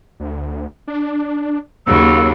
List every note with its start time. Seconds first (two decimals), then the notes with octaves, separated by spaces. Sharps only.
0.20 D2
0.87 D4
1.87 D#2 C#3 F#3 A#3 E6